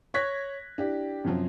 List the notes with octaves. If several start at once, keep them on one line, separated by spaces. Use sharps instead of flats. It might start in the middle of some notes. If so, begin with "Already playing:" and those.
C#5 C#6 F#6 G#6 A#6 B6
D4 E4 G4
F#2 C3 F3 F#3 C4